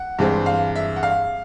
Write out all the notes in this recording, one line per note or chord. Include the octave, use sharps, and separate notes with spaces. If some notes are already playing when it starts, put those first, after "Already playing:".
Already playing: F#5
G2 E3 G#3 C4
F5
E5
F#5
F5